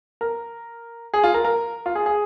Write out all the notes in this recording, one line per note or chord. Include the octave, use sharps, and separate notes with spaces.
A#4
G#4
F4
A#4
A#4
F4
G#4
G#4